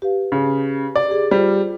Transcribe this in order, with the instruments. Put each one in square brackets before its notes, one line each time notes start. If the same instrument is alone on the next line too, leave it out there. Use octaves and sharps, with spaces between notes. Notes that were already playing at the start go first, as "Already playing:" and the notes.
[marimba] G4 B4 F5
[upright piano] C#3
D5
[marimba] G4 G#4
[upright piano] G3 [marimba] F4 C5